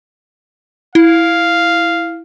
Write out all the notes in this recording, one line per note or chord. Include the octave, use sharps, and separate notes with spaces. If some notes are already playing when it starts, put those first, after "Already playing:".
E4 F5